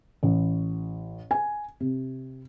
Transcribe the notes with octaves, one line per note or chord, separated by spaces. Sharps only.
A1
G#5
C3